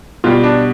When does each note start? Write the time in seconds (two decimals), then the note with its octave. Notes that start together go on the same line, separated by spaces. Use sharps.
0.24 B2 G3 F4
0.44 D4